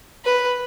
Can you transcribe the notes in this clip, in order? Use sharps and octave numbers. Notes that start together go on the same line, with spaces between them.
B4